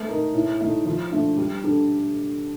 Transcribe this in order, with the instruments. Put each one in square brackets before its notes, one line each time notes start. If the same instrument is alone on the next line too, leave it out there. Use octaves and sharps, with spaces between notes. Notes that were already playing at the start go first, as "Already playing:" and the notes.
Already playing: [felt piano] A3
D#4 A#4
A2
A3 D#4
F3
A3 D4
G3
D4 A4